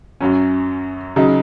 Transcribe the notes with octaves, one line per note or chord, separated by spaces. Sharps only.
F#2 F#3 C#4
C#3 F#3 D#4